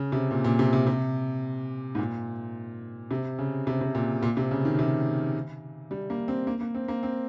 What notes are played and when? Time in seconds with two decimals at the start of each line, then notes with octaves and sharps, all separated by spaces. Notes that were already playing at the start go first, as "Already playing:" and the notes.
Already playing: C#3
0.12 C3
0.31 A#2
0.44 A#2
0.59 C3
0.73 C3
0.87 C3
1.95 G#2
1.99 A#2
3.11 C3
3.39 C#3
3.67 C3
3.81 C3
3.95 A#2
4.23 A#2
4.37 C3
4.51 C#3
4.65 D#3
4.79 C3
5.91 G3
6.10 A#3
6.28 C4
6.47 A#3
6.61 A#3
6.75 C4
6.88 A#3
7.03 C4